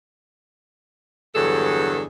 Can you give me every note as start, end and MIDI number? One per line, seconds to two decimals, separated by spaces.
1.35 2.04 40
1.35 2.04 43
1.35 2.04 50
1.35 2.04 54
1.35 2.04 68
1.35 2.04 69